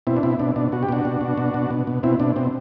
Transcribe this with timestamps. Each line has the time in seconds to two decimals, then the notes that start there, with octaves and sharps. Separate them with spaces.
0.07 B2 C4 E4
0.17 D4
0.23 B2 C4 E4
0.39 B2 D4
0.56 B2 D4
0.72 B2 F#4
0.83 G4
0.89 B2 D4 F#4
1.05 B2
1.21 B2
1.38 B2
1.54 B2
1.71 B2
1.87 B2
2.03 B2 C4 E4
2.20 B2 D4
2.36 B2 C4